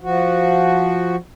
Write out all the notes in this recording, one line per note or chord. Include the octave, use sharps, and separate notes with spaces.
F3 F#4